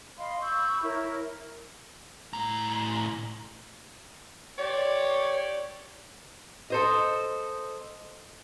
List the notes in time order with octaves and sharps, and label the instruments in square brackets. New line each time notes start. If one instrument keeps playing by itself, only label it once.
[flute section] D#5 F5 B5 C6
B5 C#6 E6 G6
E4 A#4 C#5
[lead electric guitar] A2 A#5
[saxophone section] G4 D5 [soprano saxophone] C#5
[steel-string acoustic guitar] A4 C5 D#5